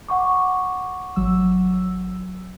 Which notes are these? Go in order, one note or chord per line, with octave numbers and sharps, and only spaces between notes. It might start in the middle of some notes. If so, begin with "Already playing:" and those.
F#5 C#6 D6
G#1 F#3 E6